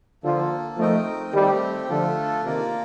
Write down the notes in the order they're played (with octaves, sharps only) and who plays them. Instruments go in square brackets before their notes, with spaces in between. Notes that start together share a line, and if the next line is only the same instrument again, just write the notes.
[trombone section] D3 F3 [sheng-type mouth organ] A#3 F4 A4
[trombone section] F3 A3 [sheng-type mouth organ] C4 D#4 A#4 D#5 G5
[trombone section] D#3 G3 [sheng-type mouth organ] A3 C4 G4
[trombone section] D3 F3 [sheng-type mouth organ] A3 D4 F4 A4
[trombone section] C3 D#3 [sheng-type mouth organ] A#3 F4 A#4 D5